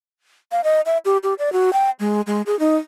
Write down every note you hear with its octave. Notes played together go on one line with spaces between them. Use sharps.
F5
D#5
E5
G4
G4
D5
F#4
G5
G#3
G#3
G#4
D#4